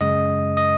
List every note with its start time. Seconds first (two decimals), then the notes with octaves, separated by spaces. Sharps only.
0.01 F#2 C#3 G#3 D#5 D#6
0.57 D#5 D#6